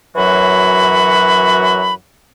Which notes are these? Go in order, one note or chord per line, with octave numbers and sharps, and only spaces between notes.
F#2 E3 F#3 F#4 F#5 B5